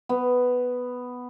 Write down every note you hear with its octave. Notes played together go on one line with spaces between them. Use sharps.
B3